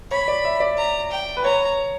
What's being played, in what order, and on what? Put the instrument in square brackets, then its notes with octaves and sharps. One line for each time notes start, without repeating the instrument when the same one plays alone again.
[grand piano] C#5 [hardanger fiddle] B5
[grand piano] D5
E5
D5
[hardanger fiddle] A#5
G5
[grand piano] B4
[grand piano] C#5 [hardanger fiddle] A#5